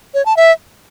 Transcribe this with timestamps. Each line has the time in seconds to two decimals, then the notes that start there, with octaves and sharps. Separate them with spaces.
0.14 C#5
0.26 A5
0.37 E5